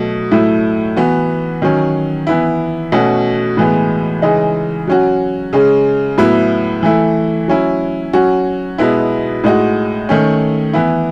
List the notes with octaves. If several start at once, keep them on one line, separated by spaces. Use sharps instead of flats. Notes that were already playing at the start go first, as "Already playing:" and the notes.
Already playing: B2 F#3 A3
A2 F#3 A3 E4
E3 B3 F#4
D#3 F#3 C#4
E3 B3 E4
B2 A3 C#4 F#4
A2 E3 G#3 B3
C#3 E3 G#3 D#4
F#3 C#4 F#4
C#3 G#3 C#4
A2 F#3 B3 E4
E3 A3 E4
F#3 C#4 E4
F#3 C#4 F#4
B2 G#3 B3 E4
A2 G#3 D#4 F#4
D#3 A3 C#4
E3 B3 E4